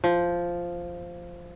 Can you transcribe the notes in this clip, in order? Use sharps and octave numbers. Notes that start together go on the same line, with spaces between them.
F3